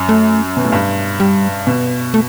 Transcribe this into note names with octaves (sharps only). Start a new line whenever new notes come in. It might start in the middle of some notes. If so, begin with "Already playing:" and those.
Already playing: F#2
A3
B2
A2
G2
G3
B2
A3